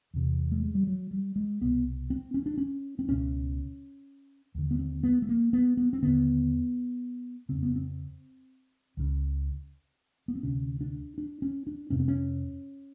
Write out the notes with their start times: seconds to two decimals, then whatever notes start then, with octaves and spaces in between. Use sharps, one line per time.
0.14 E2 C3
0.52 A3
0.64 G#3
0.75 G3
0.87 F#3
1.11 G3
1.36 G#3
1.61 C2 B2 B3
2.10 C4
2.34 C#4
2.46 D4
2.58 C#4
2.99 C4
3.08 C#2 B2 C#4
4.55 D#2 D3
4.71 B3
4.79 C4
5.03 B3
5.22 A3
5.29 A#3
5.53 B3
5.77 B3
5.93 C4
6.03 D#2 D3 B3
7.49 F2 C#3 C4
7.63 B3
7.76 C4
8.97 C#2 C#3
10.28 B3
10.35 C4
10.43 D2 C3 C#4
10.81 D4
11.18 D4
11.42 C#4
11.67 D4
11.90 F2 C3 C#4
12.00 C4
12.08 C#4